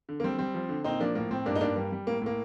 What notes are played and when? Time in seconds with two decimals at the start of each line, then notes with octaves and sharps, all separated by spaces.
0.09 D3
0.20 A#3
0.24 G3 C4
0.38 G3 C4
0.54 F3
0.69 D3
0.84 A#2 C4 D#4
1.00 F3 A#3 D4
1.15 A2 A#3
1.31 A2 C4
1.46 G2 A#3 D4
1.55 D#4
1.61 G2 A#3 D4
1.76 G3 A#3
1.92 G3
2.07 A2 A#3
2.22 A2 A#3